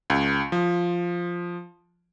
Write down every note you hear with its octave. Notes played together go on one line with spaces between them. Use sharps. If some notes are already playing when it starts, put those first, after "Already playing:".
C#2
F3